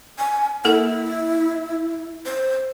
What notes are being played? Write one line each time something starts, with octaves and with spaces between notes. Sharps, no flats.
G#5
A#3 E4 A4 A#4
C5